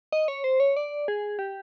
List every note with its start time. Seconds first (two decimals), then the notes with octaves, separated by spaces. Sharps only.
0.12 D#5
0.28 C#5
0.44 C5
0.60 C#5
0.77 D5
1.08 G#4
1.39 G4